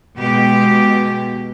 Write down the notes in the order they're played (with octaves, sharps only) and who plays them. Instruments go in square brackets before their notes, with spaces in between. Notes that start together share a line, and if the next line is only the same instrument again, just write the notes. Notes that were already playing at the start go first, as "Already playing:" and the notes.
[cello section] B2 G#3 G4